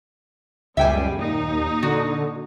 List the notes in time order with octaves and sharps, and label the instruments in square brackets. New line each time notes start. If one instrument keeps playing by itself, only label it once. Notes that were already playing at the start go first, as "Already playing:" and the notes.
[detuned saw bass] C#2 [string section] F#2 B2 G3 [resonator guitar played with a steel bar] E5 G5 G#5
[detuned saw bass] D#2 [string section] A#2 D#4
[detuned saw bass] D3 [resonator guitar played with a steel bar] F#4